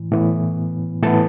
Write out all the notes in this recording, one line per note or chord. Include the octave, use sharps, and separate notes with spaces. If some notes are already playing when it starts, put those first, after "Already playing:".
Already playing: A2 E3
A2 E3 B3
A2 E3 B3 A4 A5